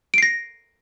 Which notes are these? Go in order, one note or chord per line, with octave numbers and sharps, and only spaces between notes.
A#6 C7 D7